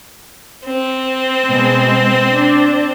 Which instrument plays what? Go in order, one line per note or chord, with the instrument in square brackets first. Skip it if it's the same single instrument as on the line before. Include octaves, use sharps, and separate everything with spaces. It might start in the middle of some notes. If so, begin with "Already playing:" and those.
[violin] C4
[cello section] B2 G#3
D4